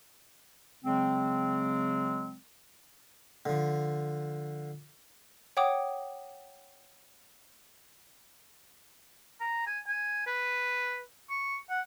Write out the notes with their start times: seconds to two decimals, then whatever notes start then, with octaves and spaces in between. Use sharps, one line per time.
0.84 C#3 F#3 G#3 C4
3.45 D3 F3
5.57 C#5 F#5 G5 D6 D#6
9.41 A#5
9.67 G#5
9.87 G#5
10.27 B4
11.30 C#6
11.70 F#5